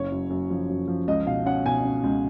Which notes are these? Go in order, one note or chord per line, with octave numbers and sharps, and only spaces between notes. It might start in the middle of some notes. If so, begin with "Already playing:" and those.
Already playing: F#1 C#3 C#5
F#2
F#2
F3
F#2
F3
C#2 D#5
B2 F5
C#4 F#5
B2 G#5
C#4
C#2